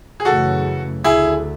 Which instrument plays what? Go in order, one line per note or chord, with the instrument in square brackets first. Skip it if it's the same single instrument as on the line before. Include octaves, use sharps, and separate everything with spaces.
[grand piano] G#4
[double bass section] F#2 C#3 E3 A3 [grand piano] F#4 A4
[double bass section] D2 D3 A3 [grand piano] E4 G#4